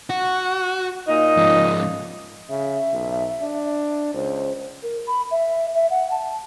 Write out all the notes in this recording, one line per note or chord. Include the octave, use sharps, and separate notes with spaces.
F#4
A#2 D#4 D#5
G#2 F3
C#3 E5
B1
D4
C#2 C5
A#4
B5
E5
E5
F#5
A5